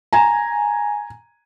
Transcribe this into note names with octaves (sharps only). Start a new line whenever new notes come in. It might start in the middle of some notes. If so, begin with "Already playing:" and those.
G#5 A#5